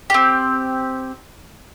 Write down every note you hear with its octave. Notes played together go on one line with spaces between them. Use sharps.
C4 G4